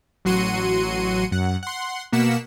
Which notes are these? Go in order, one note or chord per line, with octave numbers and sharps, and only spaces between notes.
A1 F#3 F#4 C6 C#7 D#7
F#2 F#5
F#5 C6
B2 A#3 F#5 B6 C#7 E7